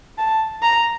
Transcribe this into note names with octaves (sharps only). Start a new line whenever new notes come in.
A5
A#5